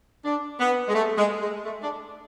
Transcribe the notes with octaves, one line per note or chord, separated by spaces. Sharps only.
D4
B3
G#3
A3
G#3
G#3
A3
D4